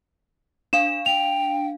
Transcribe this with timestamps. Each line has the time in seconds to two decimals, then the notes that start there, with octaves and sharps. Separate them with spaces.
0.73 D4 F5 E7
1.06 G5 F7